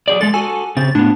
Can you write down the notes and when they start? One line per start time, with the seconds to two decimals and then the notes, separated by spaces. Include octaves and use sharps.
0.08 F#3 G#4 D5
0.21 G#3 A4 A6
0.34 F#4 A4 G#5
0.77 C#3 C4 A6
0.95 A2 B3 D4